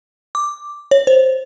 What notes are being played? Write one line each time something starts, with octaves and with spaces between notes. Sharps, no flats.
D6
C#5
C5